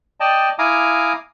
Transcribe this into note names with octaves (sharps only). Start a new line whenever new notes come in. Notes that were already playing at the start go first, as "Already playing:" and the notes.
D5 D#5 G5 A5
E4 F5 G#5 A#5 D6 D#6